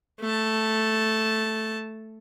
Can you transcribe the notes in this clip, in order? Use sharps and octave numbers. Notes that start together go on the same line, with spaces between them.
A3 A5